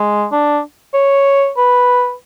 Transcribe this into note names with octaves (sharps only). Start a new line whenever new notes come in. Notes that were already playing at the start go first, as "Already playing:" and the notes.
Already playing: G#3
D4
C#5
B4